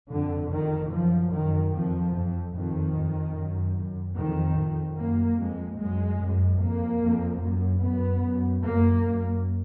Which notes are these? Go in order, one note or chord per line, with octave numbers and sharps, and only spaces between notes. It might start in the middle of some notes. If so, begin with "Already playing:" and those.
F2 D3
F2 D#3
F#2 F3
F#2 D#3
F2 F3
F2
F2 D#3
F2
F#2
F#2
F2 D#3
F2
F#2 A#3
F2 G#3
F#2 G#3
F#2
F2 A#3
F2
F#2
F#2 B3
F#2
F#2 A#3
F#2